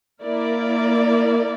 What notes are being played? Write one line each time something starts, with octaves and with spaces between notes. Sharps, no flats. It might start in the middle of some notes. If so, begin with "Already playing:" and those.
A#3 E4 A#4 D5